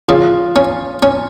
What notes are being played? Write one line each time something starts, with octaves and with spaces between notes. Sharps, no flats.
C#3 F4
C#4
C#4